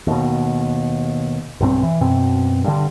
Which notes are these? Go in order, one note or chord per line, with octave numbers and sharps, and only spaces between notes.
D#2 B2
B1 G2 F3 C4
E3
F#2 B2 C4
G2 D3